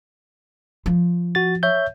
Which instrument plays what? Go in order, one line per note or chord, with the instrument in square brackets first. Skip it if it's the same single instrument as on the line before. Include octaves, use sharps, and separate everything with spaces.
[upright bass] F3
[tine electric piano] F#4 A6
C#5 E5 G6